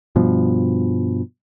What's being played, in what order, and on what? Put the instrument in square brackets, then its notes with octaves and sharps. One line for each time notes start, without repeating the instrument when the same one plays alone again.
[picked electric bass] G2 B2 F3